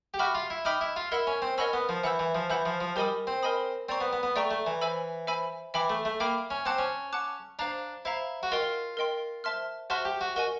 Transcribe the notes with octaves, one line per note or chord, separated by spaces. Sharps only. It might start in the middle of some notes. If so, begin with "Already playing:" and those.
G4
F#4 E5 G5 B5 D6 F6
F4
E4
D#4 E5 G5 B5 D6 F6
E4
F4
E4 A#4 D#5 F#5 B5 E6
C#4
C4
C#4 A#4 D#5 F#5 B5 E6
B3
F3
E3 F#5 B5 E6 G6
E3
F3
E3 F#5 B5 E6 G6
F3
F3
G3 A#4 D#5 G#5 B5 D#6
C4
A#4 D#5 G#5 B5 D#6
C4 D5 G5 A#5 C#6
B3
B3
B3
A3 D5 G5 A#5 C#6
A3
E3
C5 E5 G#5 B5 E6
C5 E5 G#5 B5 E6
E3 E5 G5 B5 D6
A3
A3
A#3 E5 G5 B5 D6
C#4
C4 F#5 A5 D6 F#6
C#4
F#5 A5 D6 F#6
D4 C5 F5 A#5
E4 C5 F5 A#5
F#4
F4 A#4 D#5 G5 C6
A#4 D#5 G5 C6
C5 E5 A5 C6 F6
F#4 C5 E5 A5 C6 F6
G4
F#4
F#4 A#4 D#5 G#5